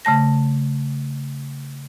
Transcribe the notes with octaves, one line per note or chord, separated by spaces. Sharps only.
C#3 A3 A5 A#6